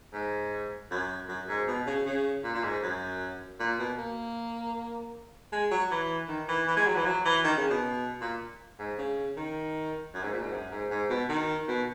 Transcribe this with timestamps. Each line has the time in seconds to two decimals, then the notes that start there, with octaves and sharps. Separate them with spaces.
0.13 G#2
0.91 F#2
1.29 F#2
1.48 G#2
1.67 B2
1.87 C#3
2.06 C#3
2.44 A#2
2.54 A#2
2.64 G#2
2.82 F#2
3.60 A#2
3.79 B2
3.98 A#3
5.52 G#3
5.71 F#3
5.91 E3
6.29 D#3
6.48 E3
6.68 E3
6.77 G#3
6.87 F#3
6.96 E3
7.06 F#3
7.25 E3
7.44 D#3
7.57 C#3
7.70 B2
8.21 A#2
8.79 G#2
8.98 C#3
9.37 D#3
10.14 F#2
10.24 G#2
10.33 A#2
10.42 G#2
10.52 F#2
10.72 G#2
10.90 G#2
11.10 B2
11.29 D#3
11.68 B2